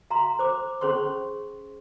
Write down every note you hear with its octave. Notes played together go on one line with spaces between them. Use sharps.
F5 A#5 C6
C5 D6
C#4 G#4 C5 C6 C#6